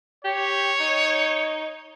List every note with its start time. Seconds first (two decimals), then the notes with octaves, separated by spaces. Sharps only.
0.25 G4 C#5
0.80 D#4